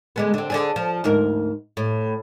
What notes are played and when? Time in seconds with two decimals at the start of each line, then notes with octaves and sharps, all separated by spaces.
0.16 D3 G#3 B3
0.34 D3 C4
0.50 D3 D4 G#4
0.76 F3
1.04 D2 G#2 A#4
1.77 A2